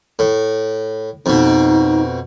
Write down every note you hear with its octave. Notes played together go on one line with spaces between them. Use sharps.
A2
F2 B2 D#4